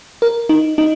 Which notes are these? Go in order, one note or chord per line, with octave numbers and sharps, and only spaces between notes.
A#4
D#4
D#4